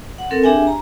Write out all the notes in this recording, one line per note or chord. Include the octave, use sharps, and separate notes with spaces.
F#5
C4 A4 A#4
D4 G4 G#4 E5 G5 G#5
A#5